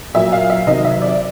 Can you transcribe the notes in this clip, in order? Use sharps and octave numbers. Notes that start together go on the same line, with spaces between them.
A#2 F#3 E5
F5
E5
C3 D#3 F#3 D#5
E5
D5